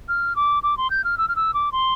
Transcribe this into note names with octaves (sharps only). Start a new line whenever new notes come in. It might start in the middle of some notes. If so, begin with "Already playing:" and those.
F6
D6
D6
C6
G6
F6
E6
F6
E6
D6
C6